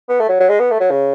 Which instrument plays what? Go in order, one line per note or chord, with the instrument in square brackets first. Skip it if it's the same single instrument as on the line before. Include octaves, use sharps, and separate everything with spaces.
[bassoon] B3
A3
F#3
F#3
G#3
B3
A3
F#3
C#3